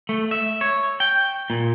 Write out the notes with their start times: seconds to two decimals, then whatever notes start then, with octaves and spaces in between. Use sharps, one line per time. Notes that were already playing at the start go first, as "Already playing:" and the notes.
0.09 A3
0.31 E5
0.61 C#5
1.00 G5
1.50 A#2